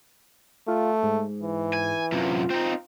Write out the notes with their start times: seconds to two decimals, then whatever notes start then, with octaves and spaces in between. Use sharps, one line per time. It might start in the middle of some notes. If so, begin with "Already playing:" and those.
0.68 A3 F4
1.03 G#2
1.42 E3
1.74 G#5
2.12 F#2 C3 F4
2.50 C4 D#4